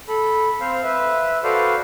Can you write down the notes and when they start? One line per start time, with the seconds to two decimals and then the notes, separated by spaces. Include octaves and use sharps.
0.08 A4 B5
0.61 C4 C5 F5
0.84 B4 E5
1.44 F#4 A4 B4 C5 D5 F5